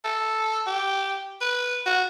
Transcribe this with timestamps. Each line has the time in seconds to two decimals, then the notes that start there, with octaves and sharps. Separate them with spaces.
0.05 A4
0.67 G4
1.41 B4
1.86 F#4